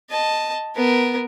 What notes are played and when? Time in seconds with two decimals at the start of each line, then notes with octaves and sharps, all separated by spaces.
0.10 D#5 A5
0.75 B3 A#4